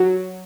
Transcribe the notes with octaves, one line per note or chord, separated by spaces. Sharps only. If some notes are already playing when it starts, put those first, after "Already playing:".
Already playing: F#3